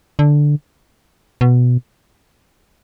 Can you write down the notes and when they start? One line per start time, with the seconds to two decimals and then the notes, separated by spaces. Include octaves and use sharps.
0.19 D3
1.41 B2